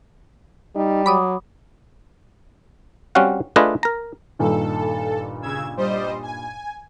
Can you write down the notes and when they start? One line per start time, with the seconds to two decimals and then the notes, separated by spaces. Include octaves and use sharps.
0.76 G3 D#4
1.06 F#3 B5 D6 D#6
3.15 G3 C4 C#4 F#4 F5 F#5
3.56 A3 D4 F4 G#4 B4 D#5
3.83 A#4 A#5
4.39 G2 A#2 D#3 A4
5.42 C#3 E6 G#6
5.77 G3 C5 D#5
6.23 G#5